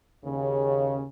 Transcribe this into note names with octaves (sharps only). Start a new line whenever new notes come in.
D#2 C#3